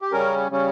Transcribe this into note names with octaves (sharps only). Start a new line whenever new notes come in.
G4
C#3 G3 C#4 A#4
C#3 G3 C#4